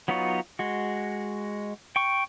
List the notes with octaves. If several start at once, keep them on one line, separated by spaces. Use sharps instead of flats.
F#3 B3 D#4 F4 C#5
G#3 F#4
G5 C#6